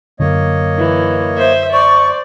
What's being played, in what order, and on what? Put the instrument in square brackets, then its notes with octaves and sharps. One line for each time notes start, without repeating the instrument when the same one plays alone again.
[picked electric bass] F#2 D3 [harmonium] A#3 C#5 D#5
[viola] E3
C5 E5
[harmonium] C5 [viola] D5 [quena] C#6